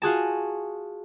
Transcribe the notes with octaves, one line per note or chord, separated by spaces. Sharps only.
F4 F#4 G#4 A5